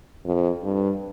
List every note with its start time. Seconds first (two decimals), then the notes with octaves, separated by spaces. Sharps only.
0.25 F2
0.63 G2